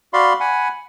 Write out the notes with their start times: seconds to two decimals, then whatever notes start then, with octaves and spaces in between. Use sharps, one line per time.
0.13 F#4 D5 F5 B5 C6
0.40 F#5 G#5 B5